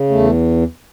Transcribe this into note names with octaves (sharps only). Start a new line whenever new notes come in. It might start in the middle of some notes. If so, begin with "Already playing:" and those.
Already playing: C#3
E2 A3